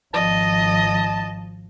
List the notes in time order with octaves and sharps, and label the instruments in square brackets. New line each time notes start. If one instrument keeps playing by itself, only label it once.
[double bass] G#1 F3 [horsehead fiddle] D#5 [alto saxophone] A5